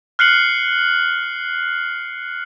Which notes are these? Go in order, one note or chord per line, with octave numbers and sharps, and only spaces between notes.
F6 F#6 C7 C#7 F#7